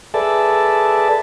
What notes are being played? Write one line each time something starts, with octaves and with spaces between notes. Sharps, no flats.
G#4 A4 B4 D5 E5 A5